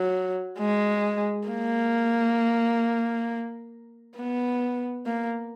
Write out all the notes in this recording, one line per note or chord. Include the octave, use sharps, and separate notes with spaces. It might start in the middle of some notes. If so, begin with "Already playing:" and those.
Already playing: F#3
G#3
A#3
B3
A#3